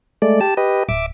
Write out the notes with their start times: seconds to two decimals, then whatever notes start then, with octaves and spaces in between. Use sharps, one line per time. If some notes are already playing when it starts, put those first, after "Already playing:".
0.22 G#3 A3 D5
0.41 G4 A5
0.57 G4 B4 D#5
0.89 D1 E5 D6